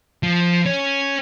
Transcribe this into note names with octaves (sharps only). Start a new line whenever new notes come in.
F3
C#4